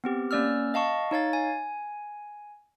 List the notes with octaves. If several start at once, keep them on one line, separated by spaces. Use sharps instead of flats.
B3 C4 G4
A#3 C#4 D5 E6 F6
D#5 F5 A5 C#6
D#4 C#5 F5 A6
G#5